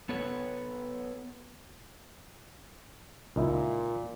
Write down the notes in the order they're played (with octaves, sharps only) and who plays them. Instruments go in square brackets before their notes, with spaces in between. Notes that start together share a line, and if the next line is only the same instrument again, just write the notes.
[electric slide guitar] B3 A4 B4 C#5
[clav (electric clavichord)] C#2 D#4 E4 [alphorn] A#2